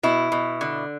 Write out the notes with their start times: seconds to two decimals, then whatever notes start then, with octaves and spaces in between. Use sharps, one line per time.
0.03 B2 E4
0.32 B2
0.61 D3